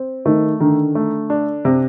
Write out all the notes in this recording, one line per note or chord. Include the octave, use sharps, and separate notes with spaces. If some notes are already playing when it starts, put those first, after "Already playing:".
Already playing: C4
D#3 A3
D3 D#3
A3
D4
C3